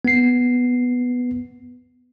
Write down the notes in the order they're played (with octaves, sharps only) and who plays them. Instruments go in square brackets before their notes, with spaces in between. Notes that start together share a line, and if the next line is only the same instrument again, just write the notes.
[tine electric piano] B3 C7